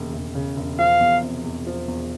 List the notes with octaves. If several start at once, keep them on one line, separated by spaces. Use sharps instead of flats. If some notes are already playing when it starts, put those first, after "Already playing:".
Already playing: E1 D#2 C#3
E1
C#3
E1
F3 F5
E2
C3
E2
F3
E2